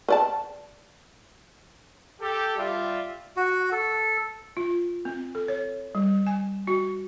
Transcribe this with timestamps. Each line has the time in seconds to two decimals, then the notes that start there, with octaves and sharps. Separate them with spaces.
0.08 B4 D5 A5
2.20 G4 A4
2.57 G3 F4 D5 E5
3.37 F#4
3.72 A4
4.57 F4
5.05 C4
5.35 A4
5.48 C#5
5.95 G3
6.27 G#5
6.67 F#4